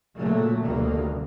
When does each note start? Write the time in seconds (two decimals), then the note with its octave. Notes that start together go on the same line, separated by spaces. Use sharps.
0.17 A#2 C#3 F#3 A3
0.61 F1 D2 D#3 G3 A#3